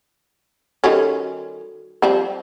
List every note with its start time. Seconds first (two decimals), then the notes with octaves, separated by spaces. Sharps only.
0.84 D#3 G3 C#4 F#4 A4
2.02 F3 G3 C4